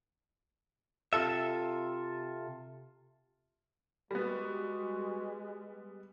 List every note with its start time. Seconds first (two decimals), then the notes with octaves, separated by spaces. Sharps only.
1.13 C3 F4 A4 E5
4.11 G3 G#3 B3 F#4